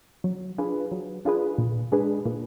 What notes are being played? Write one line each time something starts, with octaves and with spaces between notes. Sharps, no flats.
F#3
D4 F4 G#4 B4
F#3
D4 F4 G#4 B4
A#2
G#3 D4 G#4 B4
A#2